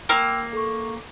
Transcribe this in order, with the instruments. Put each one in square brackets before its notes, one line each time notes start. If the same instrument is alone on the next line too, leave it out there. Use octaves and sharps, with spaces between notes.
[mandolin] A#3 F6 [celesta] G5 C6 E6
[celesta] A4 C#6